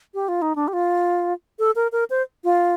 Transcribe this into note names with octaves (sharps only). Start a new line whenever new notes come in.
G4
F4
D#4
D4
G4
F4
A4
A#4
A#4
C5
F4